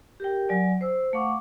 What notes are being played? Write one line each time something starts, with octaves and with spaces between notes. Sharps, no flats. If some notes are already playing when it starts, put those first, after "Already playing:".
G4 A#4 G5
F#3 D5 G#5
C5 E6
A3 F5 F#5 C#6 D6